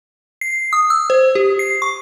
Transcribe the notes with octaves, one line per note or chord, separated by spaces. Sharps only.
C7
D#6
E6
C5
G4
C7
C#6